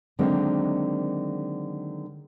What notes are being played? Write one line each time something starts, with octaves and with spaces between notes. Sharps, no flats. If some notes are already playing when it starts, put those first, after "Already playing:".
D3 D#3 F#3 G#3 A#3 C4